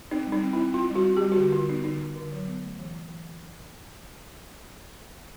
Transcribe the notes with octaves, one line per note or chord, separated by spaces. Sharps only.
C4 D#4
G3
D#4
C4
C4 E4
C4 F4
G3
F#4
C4
G3 G4
F#4
D3 G4
D3 F4
B3 D#4
D3 D#4
D3
D3
F#3
B3
A3
E3
E3
E3